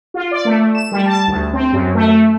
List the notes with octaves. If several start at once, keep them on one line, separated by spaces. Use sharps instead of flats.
F4
D5
A3
E7
G3
A5
D2
C4
F#2
A3